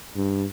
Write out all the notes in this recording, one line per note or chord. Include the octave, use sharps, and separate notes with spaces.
G2